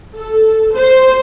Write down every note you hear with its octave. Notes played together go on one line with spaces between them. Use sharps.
A4
C5